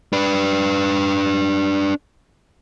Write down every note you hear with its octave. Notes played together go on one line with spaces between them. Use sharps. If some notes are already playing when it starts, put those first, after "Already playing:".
D4 B4